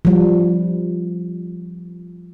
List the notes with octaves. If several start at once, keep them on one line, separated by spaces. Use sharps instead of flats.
F3 G3